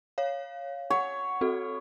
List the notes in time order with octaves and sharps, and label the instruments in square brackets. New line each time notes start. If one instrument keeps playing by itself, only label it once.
[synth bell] C#5 F5
[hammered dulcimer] C#5 [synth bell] F#5
[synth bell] C4 F#4 A4